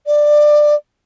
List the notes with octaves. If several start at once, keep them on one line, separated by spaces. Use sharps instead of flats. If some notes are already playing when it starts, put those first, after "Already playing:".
D5